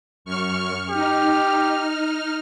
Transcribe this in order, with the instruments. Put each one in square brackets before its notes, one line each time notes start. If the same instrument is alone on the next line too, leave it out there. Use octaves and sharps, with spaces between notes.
[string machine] F#2 C#6 F6
[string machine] D#4 F6 [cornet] G4